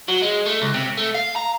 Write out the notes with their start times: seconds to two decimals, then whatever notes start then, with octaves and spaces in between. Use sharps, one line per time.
0.08 F#3
0.22 G#3
0.46 A3
0.62 C#2
0.74 C3
0.97 A3
1.15 F5
1.36 A#5